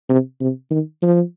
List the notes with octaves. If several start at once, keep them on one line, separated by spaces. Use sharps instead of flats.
C3
C3
D#3
F3